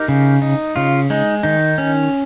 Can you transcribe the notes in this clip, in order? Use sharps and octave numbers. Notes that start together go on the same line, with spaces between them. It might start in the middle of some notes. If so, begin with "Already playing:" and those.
Already playing: D#4 G4 A#4
C#3
D#4
C#3 F4
G#3 D#4
D#3 D#4
C#4